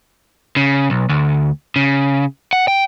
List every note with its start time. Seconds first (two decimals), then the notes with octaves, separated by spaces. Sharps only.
0.56 C#3
0.90 B1
1.09 D2
1.76 C#3
2.53 F#5
2.68 G5